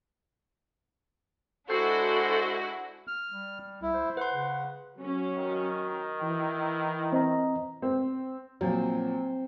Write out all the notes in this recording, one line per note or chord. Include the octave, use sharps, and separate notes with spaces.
G#3 D4 E4 F#4 A4 C5
F6
G3
C2 E4
C5
B4 F#5 C6
C#3
F#3 C#4
D#3
E3 E4
C4 D#5 A#5
C4
A#2 F3 F#3 C4